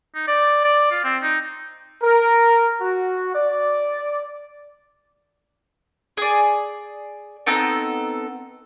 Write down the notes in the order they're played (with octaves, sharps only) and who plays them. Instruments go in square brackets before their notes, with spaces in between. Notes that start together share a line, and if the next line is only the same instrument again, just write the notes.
[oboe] D#4
D5
D5
F4
C4
D#4
[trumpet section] A#4
F#4
D5
[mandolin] G#4 D5
B3 C4 D#4 A4